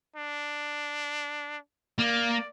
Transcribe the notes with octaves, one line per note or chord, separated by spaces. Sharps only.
D4
A#3 D5